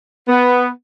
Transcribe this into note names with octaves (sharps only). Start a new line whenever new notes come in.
B3